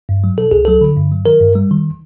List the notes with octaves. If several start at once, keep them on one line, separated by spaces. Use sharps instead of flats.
G2
F#3
B2 A4
C#2 G#4
F#3 A4
D3
G2
F#3
D#3 A#4
G2
G3
D#3